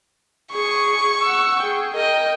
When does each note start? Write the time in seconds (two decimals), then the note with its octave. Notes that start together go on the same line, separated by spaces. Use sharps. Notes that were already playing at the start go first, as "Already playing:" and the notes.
0.52 G#4 C#6
1.22 F#5 E6
1.60 G#4 G5
1.95 A#4 D#5 G5